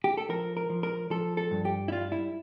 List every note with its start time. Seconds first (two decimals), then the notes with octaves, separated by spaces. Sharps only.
0.04 G4
0.17 A4
0.29 F3 A#4
0.57 A#4
0.70 F3
0.83 A#4
1.10 F3 A4
1.37 A4
1.51 G2
1.65 G4
1.88 E4
1.92 G3 F4
2.12 E4